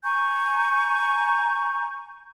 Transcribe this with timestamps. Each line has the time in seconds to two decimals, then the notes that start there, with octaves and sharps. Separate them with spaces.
0.03 G#5 A#5 C#6 G6